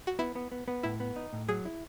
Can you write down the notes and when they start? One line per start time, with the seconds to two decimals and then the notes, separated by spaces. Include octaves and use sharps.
0.07 F#4
0.19 B3 E4
0.36 B3
0.52 B3
0.68 B3
0.83 A2 E4
1.00 B3
1.16 D#4
1.33 A2
1.48 F#3 G#4
1.65 E4